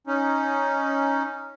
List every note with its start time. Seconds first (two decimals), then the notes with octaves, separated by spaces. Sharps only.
0.07 C#4 D#4